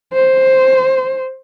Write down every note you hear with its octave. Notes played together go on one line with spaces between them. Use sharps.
C5